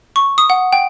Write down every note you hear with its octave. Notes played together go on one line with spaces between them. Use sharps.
C#6
D#6
F#5
G5